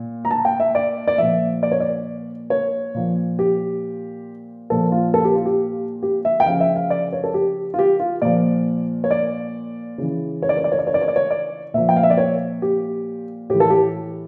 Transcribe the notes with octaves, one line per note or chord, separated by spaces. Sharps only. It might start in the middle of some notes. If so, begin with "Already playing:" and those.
Already playing: A#2
A#5
A5
G5
E5
D5
D5
A#2 F3 E5
D5
C#5
D5
C#5
A#2 F3
G4
A#2 F3 A4
F4
A4
G4
F4
G4
G4
E5
G5
C#3 F3 F5
E5
F5
D5
C#5
A4
G4
F4
G4
F4
A#2 F3 D5
C#5
D5
C#3 E3
C#5
D5
C#5
D5
C#5
D5
C#5
D5
C#5
D5
C#5
D5
A#2 F3 E5
G5
F5
E5
D5
C#5
G4
A2 E3 G4
A4
G4